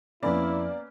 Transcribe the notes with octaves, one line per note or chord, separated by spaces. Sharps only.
F2 F3 A#3 B3 C#4 E4 D5 B5